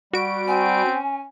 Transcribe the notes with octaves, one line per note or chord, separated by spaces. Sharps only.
G3 F#4 D7
C4 G#5
C#4